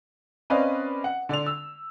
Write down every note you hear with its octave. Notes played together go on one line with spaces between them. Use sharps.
C4 C#4 B4 D5 D#5 F5
F#5
D3 D5 C6 F7
E6